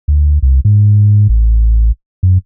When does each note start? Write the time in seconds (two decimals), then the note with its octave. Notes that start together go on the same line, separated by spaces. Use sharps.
0.08 D2
0.42 C2
0.65 G#2
1.29 A1
2.23 F#2